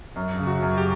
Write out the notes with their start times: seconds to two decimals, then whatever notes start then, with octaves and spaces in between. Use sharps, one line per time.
0.16 F#2
0.39 C#3
0.47 F#4
0.63 F#2
0.78 G4